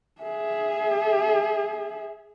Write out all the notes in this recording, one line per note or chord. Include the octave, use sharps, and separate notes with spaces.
G#4 E5